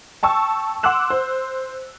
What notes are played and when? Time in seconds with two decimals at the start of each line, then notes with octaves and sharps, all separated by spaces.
0.23 G5 A5 C#6 E6
0.83 F#5 C6 D6 E6 F#6 E7
1.10 C5